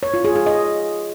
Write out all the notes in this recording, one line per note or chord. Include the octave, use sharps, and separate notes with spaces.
C#5
F4
G#4
G#4
D#5